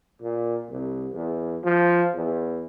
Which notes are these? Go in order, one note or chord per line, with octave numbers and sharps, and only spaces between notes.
A#2
C2
E2
F3
E2